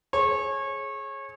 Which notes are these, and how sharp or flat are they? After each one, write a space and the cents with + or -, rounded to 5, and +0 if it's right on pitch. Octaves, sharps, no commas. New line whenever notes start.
G#4 +30 C#5 -25